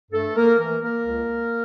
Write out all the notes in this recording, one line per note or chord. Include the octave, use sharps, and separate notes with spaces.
G2 A3 A4
A#3 A#4
E3 A3 A#3 A#4
A#3 A#4
C#2